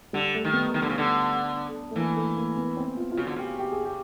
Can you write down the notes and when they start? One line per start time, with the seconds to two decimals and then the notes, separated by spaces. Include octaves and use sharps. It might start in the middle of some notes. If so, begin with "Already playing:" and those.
0.13 D3 G3
0.34 A3
0.45 D#3
0.53 B3
0.74 D#3
0.82 D3
0.89 C#3
0.98 D3
1.91 A3
1.96 E3 A#3
2.17 A3
2.37 A#3
2.57 B3
2.77 C4
2.97 F4
3.12 F4
3.17 C#3 F#4
3.27 D3
3.36 C#3 G4
3.59 G4
3.72 G#4
3.85 G4